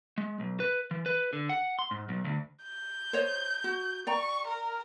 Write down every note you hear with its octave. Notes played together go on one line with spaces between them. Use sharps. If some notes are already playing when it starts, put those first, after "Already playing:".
G#3
B1
B4
E3
B4
D3
F#5
C6
G#2
B1
D2
G6
C5 C#5 D#5
F#4
D5 G5 A#5 C#6
A#4